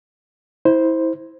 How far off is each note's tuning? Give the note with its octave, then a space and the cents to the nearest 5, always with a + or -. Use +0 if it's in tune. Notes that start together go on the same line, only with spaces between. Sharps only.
E4 -25 C5 +0